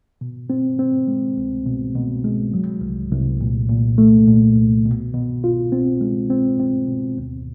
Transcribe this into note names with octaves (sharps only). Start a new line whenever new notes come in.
B2
C4
C4
G#3
C2
B2
B2
G#3
F#3
C2
C2
A#2
A#2
A3
A#2
C2
B2
B2
F4
C4
G#3
C4
C4
B2
D2